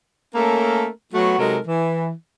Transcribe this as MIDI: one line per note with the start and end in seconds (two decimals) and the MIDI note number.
0.35 0.88 57
0.35 0.88 58
0.35 0.88 61
0.35 0.88 69
0.35 0.88 70
1.14 1.36 54
1.14 1.36 57
1.14 1.36 59
1.14 1.36 66
1.39 1.58 48
1.39 1.58 54
1.39 1.58 56
1.39 1.58 63
1.39 1.58 69
1.39 1.58 70
1.67 2.11 52